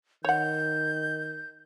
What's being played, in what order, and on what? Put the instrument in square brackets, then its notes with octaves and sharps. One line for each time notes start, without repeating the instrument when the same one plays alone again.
[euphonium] D#3 [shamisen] C#5 F#5 [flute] G6